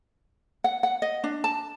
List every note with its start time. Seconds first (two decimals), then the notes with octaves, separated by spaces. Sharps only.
0.64 F#5
0.83 F#5
1.02 D#5
1.24 D4
1.44 A5